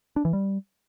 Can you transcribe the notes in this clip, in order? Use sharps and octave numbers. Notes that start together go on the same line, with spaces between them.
D4
E3
G3